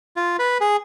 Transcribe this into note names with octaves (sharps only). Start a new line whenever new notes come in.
F4
B4
G#4